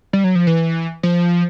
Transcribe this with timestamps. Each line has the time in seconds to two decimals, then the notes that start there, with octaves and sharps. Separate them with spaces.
0.13 G3
0.24 F#3
0.35 F3
0.47 E3
1.03 F3